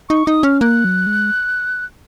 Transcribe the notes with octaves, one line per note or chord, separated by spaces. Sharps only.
D#4 C#6
D#4 D#6
C#4 F6
A#3 F#6
F#3
G#3